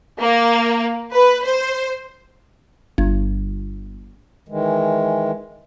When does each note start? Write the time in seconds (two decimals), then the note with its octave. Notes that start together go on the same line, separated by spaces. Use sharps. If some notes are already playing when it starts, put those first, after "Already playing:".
0.20 A#3
1.13 B4
1.45 C5
2.98 G1
4.49 D#3 E3 G#3